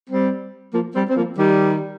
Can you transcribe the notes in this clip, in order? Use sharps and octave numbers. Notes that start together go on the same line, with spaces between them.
G3 C4
F3 A#3
G3 C4
C4
F3 A#3
D#3 G3